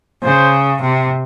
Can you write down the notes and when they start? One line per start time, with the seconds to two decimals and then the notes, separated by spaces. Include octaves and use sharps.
0.23 C#3 C5
0.81 C3